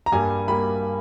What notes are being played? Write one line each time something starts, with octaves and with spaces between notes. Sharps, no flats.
A#5
G2 G3 A#3 G#5
G3 A#3 B5